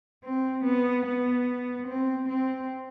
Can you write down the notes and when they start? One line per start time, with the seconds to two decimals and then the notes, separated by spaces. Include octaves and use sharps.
0.24 C4
0.65 B3
1.06 B3
1.88 C4
2.29 C4